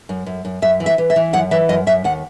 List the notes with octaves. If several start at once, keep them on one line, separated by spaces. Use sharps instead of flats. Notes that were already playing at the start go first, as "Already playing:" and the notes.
F#2
F#2
F#2
F#2 E5
E3
E5
E3
E5
E3
F#2 F#5
E3 E5
F#2 D#5
F#2 E5
D#2 F#5